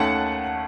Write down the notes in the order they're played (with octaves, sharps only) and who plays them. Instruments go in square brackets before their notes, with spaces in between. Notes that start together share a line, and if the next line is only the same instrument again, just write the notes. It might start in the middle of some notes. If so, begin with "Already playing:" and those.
Already playing: [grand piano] D#2 D#3 A3 C#4 F#5 A5